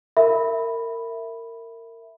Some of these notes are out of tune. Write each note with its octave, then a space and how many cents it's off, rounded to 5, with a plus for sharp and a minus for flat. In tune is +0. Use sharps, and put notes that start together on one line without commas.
A#4 -25 E5 +0 B5 +0